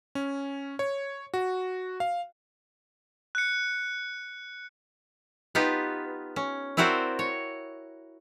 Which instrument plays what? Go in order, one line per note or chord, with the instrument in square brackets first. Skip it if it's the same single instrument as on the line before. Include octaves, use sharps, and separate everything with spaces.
[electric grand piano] C#4
C#5
F#4
F5
[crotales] F#6 C#7
[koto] B3 D#4 F4 G4 B4
C#4
C4 E4 F#4 A#4 C5 D5
C#5